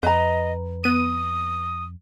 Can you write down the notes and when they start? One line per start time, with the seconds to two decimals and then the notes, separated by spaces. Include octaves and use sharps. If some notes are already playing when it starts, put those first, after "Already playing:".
0.03 F2 B4 D#5 A#5
0.84 B3 D#6 D#7